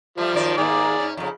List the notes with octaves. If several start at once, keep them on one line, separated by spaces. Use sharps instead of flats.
F3 G3 A3
F#2 D#3 D5
D#2 G#2 A#3 G#4 D5
G#2 C#4
F2 C#3